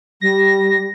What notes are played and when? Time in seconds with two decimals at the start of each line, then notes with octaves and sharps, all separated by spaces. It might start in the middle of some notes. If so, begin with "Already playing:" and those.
0.21 G3 A#6